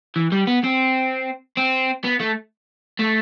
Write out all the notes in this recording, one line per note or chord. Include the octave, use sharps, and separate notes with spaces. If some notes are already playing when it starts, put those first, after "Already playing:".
E3
G3
B3
C4
C4
B3
A3
A3